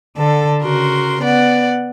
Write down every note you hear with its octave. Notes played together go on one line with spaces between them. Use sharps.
D3 A4
C#3 F#4 A#4 C6
B3 D5 F#5